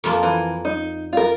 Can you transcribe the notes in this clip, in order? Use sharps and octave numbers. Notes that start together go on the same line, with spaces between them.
F2 A#3 A5
E3
D#4
F4 A#4